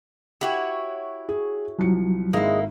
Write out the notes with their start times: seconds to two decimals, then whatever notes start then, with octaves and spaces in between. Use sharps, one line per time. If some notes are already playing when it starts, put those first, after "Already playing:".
0.41 E4 F#4 G4 C#5
1.29 G#4
1.79 C2 F3 F#3 C#7
2.33 G#1 G#3 A#3 E4